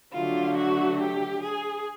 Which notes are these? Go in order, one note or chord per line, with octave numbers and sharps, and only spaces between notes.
D3 F#3 A3 F4
F#4
G4
G#4